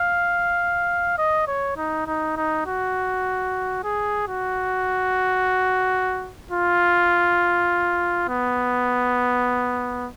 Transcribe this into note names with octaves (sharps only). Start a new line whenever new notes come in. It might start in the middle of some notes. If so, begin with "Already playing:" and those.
Already playing: F5
D#5
C#5
D#4
D#4
D#4
F#4
G#4
F#4
F4
B3